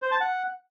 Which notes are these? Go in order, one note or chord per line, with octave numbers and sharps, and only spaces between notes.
C5
A5
F#5